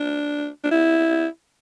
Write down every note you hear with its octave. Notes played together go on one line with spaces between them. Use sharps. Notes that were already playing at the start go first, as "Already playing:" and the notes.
Already playing: D4
D4
E4